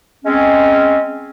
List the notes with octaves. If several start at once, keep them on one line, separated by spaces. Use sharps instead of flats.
G#3 C4 C#4